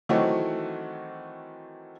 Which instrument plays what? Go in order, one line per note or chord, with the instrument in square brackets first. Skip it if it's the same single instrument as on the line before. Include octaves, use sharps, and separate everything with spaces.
[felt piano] D#3 E3 F#3 A3 C4 F#4